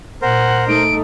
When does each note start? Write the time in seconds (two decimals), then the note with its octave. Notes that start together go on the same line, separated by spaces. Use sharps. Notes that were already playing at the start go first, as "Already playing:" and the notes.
0.22 A#2 A#4 C5 F#5
0.68 A3 D#4 D7